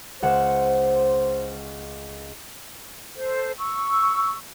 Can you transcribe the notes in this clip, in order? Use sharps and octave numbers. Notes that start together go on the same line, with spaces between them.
C#2 C5 F#5 E7
A4 C5
C#6 E6